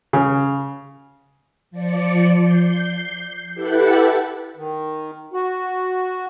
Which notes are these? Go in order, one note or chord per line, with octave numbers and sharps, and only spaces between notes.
C#3
F3 D5 C#7
G6 C7
E4 G4 A4 B4 F#5
D#3
F#4